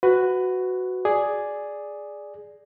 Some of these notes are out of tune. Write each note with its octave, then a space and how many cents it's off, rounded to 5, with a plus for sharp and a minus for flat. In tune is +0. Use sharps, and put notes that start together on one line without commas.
F#4 +0 B4 +20
G#4 +0 D5 +0